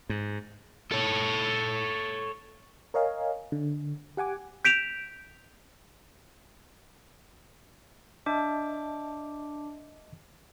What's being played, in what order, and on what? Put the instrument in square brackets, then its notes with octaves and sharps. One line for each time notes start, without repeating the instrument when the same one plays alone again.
[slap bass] G#2
[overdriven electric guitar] A4 C#5
[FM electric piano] A#4 C#5 D#5 F5 G#5
D3
G4 F#5 G#5 D6
[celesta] G6 B6 D7 E7 F7
[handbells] D4 D6 [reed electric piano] D#5 E5 A5